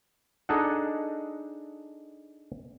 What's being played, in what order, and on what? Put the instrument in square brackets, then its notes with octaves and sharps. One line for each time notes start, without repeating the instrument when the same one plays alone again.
[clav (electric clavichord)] D4 D#4 G#4 A4 D#5 F#5